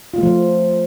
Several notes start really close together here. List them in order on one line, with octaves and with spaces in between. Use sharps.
F4 A3 F3